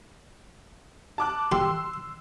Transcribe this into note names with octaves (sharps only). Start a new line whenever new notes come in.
A5 D6 F#6
G4 C6 E6